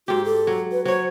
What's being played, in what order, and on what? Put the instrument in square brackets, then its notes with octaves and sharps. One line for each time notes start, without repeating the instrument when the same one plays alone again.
[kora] G#2 G4 [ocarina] F#4
[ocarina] A4
[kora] F#3
[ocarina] B4
[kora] F#3 C#5 [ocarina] C5